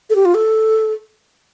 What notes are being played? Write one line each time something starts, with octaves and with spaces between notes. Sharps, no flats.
A4
G4
F4
A4